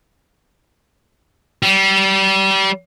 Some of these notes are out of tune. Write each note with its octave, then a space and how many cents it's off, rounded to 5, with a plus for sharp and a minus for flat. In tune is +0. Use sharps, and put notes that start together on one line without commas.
G3 -25